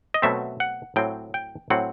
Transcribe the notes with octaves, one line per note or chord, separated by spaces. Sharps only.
D#5
B2 F#3 A3 C4 E5
F#5
A2 F#3 C4 G5
G5
A2 F#3 C4 F#5